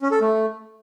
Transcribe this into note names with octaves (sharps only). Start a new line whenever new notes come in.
C#4
A4
A3